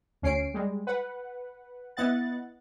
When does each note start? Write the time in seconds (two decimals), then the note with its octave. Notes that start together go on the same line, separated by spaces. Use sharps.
0.22 D2 C#4 C7 D7
0.54 G3 G#3
0.87 B4 F#5
1.97 B3 E4 D#5 F#5 F#6 A6